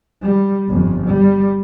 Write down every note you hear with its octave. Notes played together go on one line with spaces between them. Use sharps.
G3
G1 F2
G3